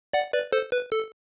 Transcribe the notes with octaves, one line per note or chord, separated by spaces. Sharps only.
D5 F#5
B4 D5
A4 C5
B4
A4